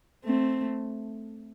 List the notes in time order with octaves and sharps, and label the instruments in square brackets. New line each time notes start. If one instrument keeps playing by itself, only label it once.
[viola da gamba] A3 C4